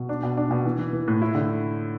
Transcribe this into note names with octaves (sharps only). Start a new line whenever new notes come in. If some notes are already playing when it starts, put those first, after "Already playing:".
Already playing: B2
D4
B2
D4
B2
E3
E3
E3
A2
E4
D3